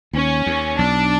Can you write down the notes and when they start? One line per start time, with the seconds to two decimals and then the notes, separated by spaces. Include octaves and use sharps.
0.13 D#2 C#4
0.46 D#2
0.79 B1 D4